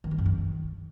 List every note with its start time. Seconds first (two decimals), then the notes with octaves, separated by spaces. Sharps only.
0.04 D#3
0.11 G3
0.18 F#2
0.26 D#3